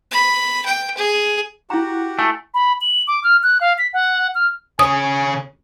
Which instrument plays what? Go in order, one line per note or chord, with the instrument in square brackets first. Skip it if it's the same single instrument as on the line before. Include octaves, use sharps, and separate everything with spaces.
[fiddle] B5
G5
G#4
[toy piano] E4 A#5 [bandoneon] F#4 G4 F#5
[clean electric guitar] A3 [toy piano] G#5
[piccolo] B5
F#7
D6
F6
F#6
F5
B6
F#5
F6
[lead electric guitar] C#3 C#5 [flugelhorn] G#5 [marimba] D#6